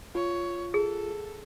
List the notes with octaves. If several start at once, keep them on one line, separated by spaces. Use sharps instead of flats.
F4 C#5
G#4 A4